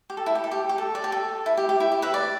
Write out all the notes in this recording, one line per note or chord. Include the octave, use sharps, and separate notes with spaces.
G4
A4
E4
G4
A4
G4
G4
A4
D5
G4
A4
E4
G4
G4
E4
G4
B4 E5
D5